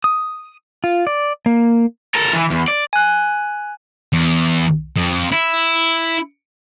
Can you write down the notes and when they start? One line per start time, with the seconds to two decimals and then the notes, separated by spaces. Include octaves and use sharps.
0.04 D#6
0.84 F4
1.07 D5
1.46 A#3
2.15 A4 A#4
2.33 E3
2.50 E2
2.68 D5
2.93 G#5 F#6
4.13 E2
4.96 F2
5.32 E4